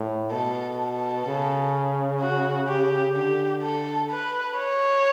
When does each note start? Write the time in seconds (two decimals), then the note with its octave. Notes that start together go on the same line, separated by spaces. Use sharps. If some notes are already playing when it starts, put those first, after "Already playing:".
Already playing: A2
0.32 B2 A4
0.79 A4
1.27 C#3
2.21 F#4
2.68 G4
3.16 D3 G4
3.63 A4
4.10 B4
4.58 C#5